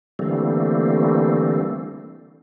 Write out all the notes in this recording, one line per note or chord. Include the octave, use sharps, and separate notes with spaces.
D3 E3 G3 A3 A#3 C4